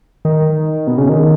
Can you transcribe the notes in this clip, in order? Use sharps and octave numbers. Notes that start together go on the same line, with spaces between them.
D#3
B2
C#3
D#3